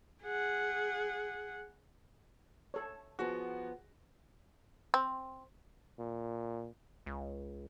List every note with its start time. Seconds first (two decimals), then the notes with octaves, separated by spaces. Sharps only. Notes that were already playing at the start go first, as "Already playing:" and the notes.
0.23 G#4 F#5
2.74 A4 C#5
3.19 F3 B3 F#4 G#4
4.94 C4
5.99 A#2
7.06 C#2